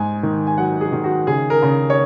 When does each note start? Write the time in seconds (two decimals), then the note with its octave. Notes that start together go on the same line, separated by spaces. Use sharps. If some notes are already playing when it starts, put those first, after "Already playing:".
Already playing: G#2 G#5
0.23 D#3
0.47 G#5
0.58 F#3 F#5
0.81 G#4
0.92 D#3
1.04 F#4
1.27 C#3 G#4
1.50 A#4
1.63 C#3
1.90 C#5